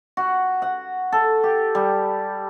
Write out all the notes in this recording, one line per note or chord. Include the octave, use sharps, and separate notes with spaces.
F#4
F#5
A4
G4
G3